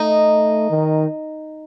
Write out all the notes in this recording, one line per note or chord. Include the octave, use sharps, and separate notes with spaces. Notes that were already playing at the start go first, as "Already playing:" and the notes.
Already playing: A3 D#4
D#3